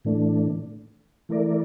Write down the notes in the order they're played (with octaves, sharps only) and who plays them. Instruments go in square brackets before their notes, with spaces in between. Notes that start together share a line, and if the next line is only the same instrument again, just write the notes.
[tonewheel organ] A2 E3 A3 D4
E3 A3 E4 A#4 D5